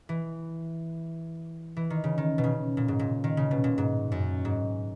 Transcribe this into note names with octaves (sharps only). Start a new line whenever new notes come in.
E3
E3
D#3
C#3
D#3
B2
C#3
A#2
G#2
A#2
D#3
C#3
B2
A#2
G#2
F#2
G#2